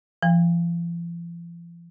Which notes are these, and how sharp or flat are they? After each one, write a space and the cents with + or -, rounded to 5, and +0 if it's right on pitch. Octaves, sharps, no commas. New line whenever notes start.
F3 -45 G5 +40